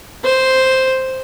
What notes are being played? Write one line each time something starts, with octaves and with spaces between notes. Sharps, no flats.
C5